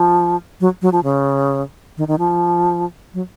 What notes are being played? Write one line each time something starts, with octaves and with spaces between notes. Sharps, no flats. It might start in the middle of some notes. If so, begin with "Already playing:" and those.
Already playing: F3
F#3
F#3
F3
C#3
D#3
D#3
F3
F#3